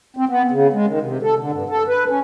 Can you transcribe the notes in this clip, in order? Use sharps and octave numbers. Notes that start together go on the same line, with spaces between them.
C4
B3
C#3
G#3
D#3
C3
A4
D3
G2
A4
B4
C#4